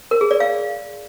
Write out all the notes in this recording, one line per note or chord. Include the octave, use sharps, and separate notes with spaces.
A#4
G#4
D5
F5